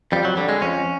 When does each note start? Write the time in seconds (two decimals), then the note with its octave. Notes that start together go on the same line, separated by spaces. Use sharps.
0.12 F2 G3
0.25 F#3
0.37 D3 G3
0.49 G#3
0.62 F2 C#4